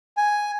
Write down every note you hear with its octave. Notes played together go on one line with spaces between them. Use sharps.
G#5